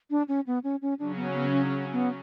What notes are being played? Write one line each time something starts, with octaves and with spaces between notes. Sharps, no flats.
D4
C#4
B3
C#4
C#4
C#3 F#3 C#4 D4
B3
B3
C#4
D4
C#4
B3